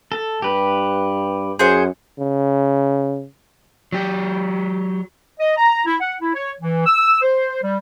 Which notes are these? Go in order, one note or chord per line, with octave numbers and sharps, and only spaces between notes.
A4
G2 G4 B4
F#2 G#4 C5 F#5
C#3
F#3 G4
D#5
A#5
E4
F#5
E4
C#5
E3
E6
C5
G3